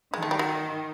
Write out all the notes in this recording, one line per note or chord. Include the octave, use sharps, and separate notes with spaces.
D#3 G#3
A3
G3
F#3